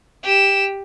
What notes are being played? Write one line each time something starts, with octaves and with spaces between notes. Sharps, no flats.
G4 E7